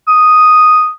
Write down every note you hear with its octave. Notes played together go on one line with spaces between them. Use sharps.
D#6